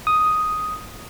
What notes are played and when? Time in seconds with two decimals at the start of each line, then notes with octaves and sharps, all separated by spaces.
0.07 D#6